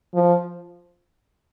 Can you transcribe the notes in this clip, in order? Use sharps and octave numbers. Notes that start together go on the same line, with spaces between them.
F3